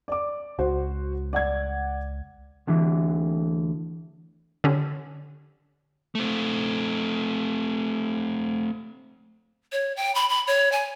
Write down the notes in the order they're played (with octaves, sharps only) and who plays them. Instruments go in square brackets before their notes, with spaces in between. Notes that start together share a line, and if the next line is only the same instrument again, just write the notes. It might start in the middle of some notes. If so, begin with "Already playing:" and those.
[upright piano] D5 D6
[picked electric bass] C#2 [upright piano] F#4 C5
[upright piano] D5 F#5 G#6
[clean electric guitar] D2 D3 E3
[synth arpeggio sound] D3 C#4 G4
[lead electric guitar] A3 C4
[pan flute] C#5
G5
B5
B5
C#5
G#5